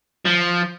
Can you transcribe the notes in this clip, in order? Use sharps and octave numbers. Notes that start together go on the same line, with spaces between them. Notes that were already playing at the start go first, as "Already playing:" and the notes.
F3